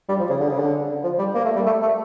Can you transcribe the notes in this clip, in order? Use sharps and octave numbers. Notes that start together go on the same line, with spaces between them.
G3
F3
C#3
D3
C#3
D3
F3
G3
A#3
A3
G3
A3
A3